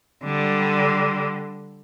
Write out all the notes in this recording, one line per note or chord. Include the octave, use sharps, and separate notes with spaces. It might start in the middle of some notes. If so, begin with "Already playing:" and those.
D3 G3